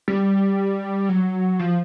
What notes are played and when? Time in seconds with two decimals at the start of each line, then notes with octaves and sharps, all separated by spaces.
0.08 G3
1.09 F#3
1.59 F3